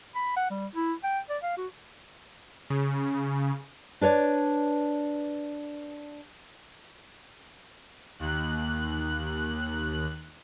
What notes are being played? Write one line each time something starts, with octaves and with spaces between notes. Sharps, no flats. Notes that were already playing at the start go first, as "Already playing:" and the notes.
B5
F#5
G3
E4
G5
D5
F5
F#4
C#3
D4 B4 C#5 D5
D#2 F#6